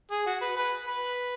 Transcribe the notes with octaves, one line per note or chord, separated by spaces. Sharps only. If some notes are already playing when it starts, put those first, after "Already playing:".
G#4
F#4
B4
B4
B4